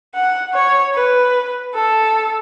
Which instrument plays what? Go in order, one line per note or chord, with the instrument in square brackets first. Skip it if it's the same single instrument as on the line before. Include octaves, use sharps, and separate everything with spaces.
[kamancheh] F#5
C#5
B4
A4